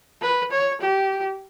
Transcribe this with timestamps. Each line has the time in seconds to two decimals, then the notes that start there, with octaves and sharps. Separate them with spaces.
0.22 B4
0.51 C#5
0.81 G4